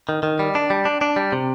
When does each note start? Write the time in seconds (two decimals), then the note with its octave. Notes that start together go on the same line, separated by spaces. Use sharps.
0.09 D#3
0.23 D#3
0.39 G3
0.55 D4
0.70 G3
0.85 D4
1.01 D4
1.16 G3
1.32 C3